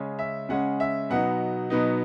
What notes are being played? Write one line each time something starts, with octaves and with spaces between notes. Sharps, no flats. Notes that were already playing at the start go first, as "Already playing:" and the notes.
Already playing: C#3 G#3 C#4
E5
C#3 G#3 C#4 F#5
E5
B2 F#3 B3 D#4 F#5
B2 F#3 B3 D#4